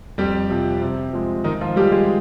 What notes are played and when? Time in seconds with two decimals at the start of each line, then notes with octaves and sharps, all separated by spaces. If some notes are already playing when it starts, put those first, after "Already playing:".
0.18 F2 G3 G4
0.50 C3 F3
0.82 C3
1.13 F3 G#3
1.44 G#2 D#3 D#4
1.61 F3 F4
1.76 F3 G3 G#3 G4
1.92 G#3 G#4